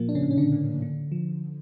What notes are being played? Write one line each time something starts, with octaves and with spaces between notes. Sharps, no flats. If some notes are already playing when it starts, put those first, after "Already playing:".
Already playing: A#2 F3 A#3
D4
C#3 C#4
A2
C#4
D3 D4
A2
D3
F3